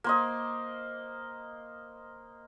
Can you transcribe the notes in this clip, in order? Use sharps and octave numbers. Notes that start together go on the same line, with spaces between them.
A#3 C5 D#5